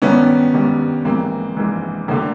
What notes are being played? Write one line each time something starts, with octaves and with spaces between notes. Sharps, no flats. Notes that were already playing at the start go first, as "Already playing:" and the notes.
G#1 G2 D#3 G3 B3 C#4
G#1 G2 D#3 G3
A#1 G#2 E3 A#3 C4
A#1 G#2 E3
G#1 D3 A3 A#3